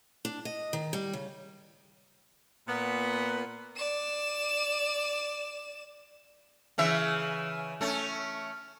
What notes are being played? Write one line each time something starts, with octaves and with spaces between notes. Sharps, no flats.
D4
D#5
D#3
G3
C#3
A#2 B3
D5 E7
C#3 E3 E5
A3 C#4